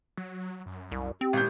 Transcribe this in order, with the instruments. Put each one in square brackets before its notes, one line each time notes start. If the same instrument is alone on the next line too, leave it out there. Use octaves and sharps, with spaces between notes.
[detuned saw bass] F#3
F#2
[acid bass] C2
[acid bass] C4 [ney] G4
[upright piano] G#1 G6 [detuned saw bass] A#2